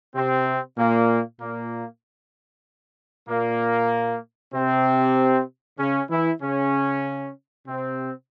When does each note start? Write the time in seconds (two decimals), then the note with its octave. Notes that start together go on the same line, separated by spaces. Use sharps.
0.15 C3 C4
0.77 A#2 A#3
1.40 A#2 A#3
3.28 A#2 A#3
4.53 C3 C4
5.79 C#3 C#4
6.10 E3 E4
6.42 C#3 C#4
7.67 C3 C4